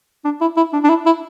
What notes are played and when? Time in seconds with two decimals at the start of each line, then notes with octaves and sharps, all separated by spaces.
0.25 D4
0.41 E4
0.57 E4
0.73 D4
0.84 D4
0.89 E4
1.06 E4